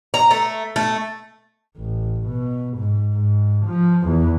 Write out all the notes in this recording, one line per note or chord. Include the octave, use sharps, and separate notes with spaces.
A#5
A3
A3
A1
B2
G#2
G#2
F3
E2